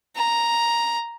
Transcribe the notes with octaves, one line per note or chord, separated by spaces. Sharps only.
A#5